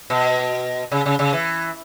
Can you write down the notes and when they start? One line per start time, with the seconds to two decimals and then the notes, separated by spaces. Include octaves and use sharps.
0.10 B2
0.92 C#3
1.06 C#3
1.19 C#3
1.33 E3